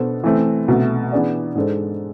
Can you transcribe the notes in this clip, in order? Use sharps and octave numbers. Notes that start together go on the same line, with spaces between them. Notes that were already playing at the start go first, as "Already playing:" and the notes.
Already playing: B2 B3 D4 A4 C5
E3 A3 C4
C2 B2 A3
E3 B3 D4 G#4 D5
G#2 G#3 D4 A4 C5